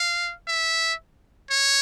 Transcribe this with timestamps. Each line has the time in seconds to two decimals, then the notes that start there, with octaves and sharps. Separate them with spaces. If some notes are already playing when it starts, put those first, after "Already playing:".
Already playing: F5
0.48 E5
1.50 C#5